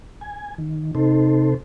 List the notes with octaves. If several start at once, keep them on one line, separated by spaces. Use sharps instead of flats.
G#5
D#3
C3 D#4 A4 C5